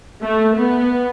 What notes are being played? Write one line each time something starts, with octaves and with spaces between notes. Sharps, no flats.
A3
B3